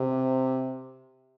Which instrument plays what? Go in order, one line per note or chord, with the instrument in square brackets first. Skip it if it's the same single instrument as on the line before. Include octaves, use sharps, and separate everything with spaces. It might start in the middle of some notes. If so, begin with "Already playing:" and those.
Already playing: [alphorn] C3